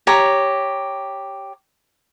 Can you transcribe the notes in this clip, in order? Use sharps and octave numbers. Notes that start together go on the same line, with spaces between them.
G4 C#5 A#5